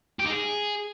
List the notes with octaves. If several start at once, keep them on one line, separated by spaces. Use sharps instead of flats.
G4
D#4
G#4